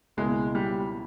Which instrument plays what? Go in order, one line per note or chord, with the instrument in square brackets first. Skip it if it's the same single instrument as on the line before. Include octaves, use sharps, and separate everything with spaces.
[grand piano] C#2 B2 A#3 E4 [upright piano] G#3
[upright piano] G3